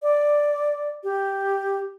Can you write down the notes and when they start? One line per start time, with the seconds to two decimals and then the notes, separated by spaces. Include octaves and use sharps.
0.03 D5
1.04 G4